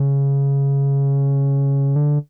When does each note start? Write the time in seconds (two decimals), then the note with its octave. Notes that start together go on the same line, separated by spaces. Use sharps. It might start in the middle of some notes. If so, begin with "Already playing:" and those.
Already playing: C#3
1.96 D3